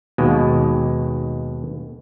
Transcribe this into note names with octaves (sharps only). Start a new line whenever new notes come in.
D#2 B2 G#3